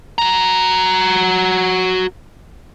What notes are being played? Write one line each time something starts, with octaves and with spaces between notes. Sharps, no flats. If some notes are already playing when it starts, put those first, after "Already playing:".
F#4 A#5